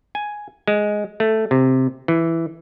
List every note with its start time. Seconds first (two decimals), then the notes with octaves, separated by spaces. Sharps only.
0.15 G#5
0.68 G#3
1.20 A3
1.51 C3
2.08 E3